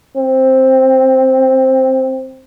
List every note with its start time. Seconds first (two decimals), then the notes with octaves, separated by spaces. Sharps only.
0.17 C4